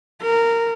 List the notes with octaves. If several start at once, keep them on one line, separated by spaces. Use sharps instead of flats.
A#4